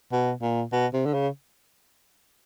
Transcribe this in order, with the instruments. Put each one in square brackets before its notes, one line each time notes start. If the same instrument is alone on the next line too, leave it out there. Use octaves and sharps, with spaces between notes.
[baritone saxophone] B2
A#2
B2
C3
D3
C#3